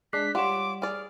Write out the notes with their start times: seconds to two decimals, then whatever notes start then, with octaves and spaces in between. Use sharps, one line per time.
0.13 G#3 D4 D6 F#6 B6 C7
0.35 G3 F4 C#5 F#5 C6 D6 E7
0.82 G#4 D5 F6